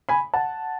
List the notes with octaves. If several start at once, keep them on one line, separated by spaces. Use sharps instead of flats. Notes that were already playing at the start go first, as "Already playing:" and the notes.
G#5 B5
F#5 A5